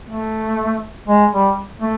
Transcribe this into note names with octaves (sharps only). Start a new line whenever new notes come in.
A3
G#3
G3
A3